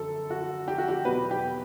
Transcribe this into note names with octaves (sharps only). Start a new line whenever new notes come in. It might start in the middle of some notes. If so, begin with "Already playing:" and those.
Already playing: F#2 D3 F#3 A4
F#4
G4
F#4
G4
E2 B2 F#3 B4
G4